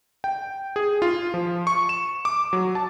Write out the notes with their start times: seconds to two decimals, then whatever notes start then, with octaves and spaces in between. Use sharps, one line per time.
0.24 G5
0.76 G#4
1.02 F4
1.34 F3
1.67 C#6
1.89 E7
2.25 D6
2.53 F#3
2.75 A5